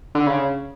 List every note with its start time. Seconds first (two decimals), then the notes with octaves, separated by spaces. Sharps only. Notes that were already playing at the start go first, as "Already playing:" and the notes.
0.15 D3
0.27 C#3